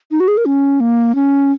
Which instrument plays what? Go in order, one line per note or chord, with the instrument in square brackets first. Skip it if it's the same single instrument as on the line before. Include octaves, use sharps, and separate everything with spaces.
[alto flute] D#4
F#4
G#4
A#4
C#4
A#3
C#4